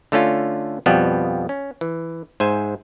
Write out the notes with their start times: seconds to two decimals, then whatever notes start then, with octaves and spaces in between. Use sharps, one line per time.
0.12 D3 A3 C#4 F4
0.86 F2 B2 F3 G3 B3
1.49 C#4
1.81 E3
2.40 G#2 C5 E5 G#5